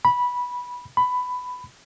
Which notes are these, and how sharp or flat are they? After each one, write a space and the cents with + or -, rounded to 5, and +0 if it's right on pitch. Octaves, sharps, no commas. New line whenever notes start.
B5 -10
B5 +15